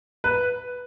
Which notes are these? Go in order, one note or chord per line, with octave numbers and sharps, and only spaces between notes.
B4